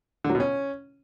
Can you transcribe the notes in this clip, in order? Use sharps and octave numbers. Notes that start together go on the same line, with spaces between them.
D3
F#3
B2
C#4